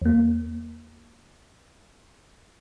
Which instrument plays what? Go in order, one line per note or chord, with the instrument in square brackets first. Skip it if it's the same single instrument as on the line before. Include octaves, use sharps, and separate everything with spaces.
[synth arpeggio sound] E2 A#3